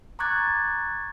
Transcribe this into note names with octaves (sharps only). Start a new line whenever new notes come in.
A#5 C#6 D6 F#6 G#6 A6